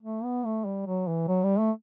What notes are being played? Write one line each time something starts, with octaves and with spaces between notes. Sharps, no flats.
A3
B3
A3
G3
F#3
E3
F#3
G3
A3